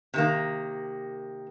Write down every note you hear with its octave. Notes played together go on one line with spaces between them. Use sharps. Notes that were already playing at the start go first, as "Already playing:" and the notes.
C3 D#3 A#3